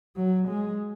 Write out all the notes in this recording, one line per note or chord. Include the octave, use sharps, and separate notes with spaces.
F#3
G#3